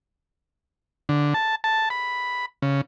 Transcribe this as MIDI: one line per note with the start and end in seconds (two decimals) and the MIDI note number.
1.09 1.34 50
1.34 1.55 81
1.64 1.89 81
1.90 2.46 83
2.62 2.81 49